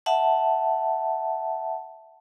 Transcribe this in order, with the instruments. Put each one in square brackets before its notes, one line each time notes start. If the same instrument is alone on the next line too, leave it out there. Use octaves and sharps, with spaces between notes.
[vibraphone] E5 F#5 A5